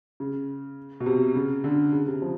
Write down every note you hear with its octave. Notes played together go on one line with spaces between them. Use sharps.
C#3
B2
C3
C#3
D3
C#3
C3
F3